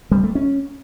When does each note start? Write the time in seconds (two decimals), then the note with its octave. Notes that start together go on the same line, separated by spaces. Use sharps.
0.11 G3
0.23 A3
0.35 C#4